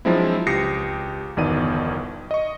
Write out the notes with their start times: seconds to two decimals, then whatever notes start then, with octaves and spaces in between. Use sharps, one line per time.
0.05 F3 F#3 G#3 C4 D4 E4
0.47 C#2 G4 D#6 A#6 C7 C#7
1.37 G1 E2 B2 D#3 D5 D#7
2.31 D#5 C#6